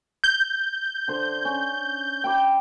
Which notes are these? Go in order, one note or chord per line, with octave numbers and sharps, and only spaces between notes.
G6
D3 C5
C#4
G5 B5 D6